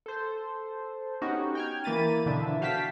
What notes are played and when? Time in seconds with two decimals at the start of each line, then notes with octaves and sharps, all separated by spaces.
0.06 A4 C5
1.21 B3 C#4 D#4 F#4 G4
1.55 G5 F6 G#6
1.84 E3 A#3 B5 A6 D#7
2.26 B2 D3 E3 F3 D4 E5
2.61 F#4 F5 G5 A5 B6